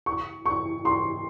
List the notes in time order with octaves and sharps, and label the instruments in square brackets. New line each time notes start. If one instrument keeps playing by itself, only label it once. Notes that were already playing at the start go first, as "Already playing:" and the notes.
[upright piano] C#6
C#6
C6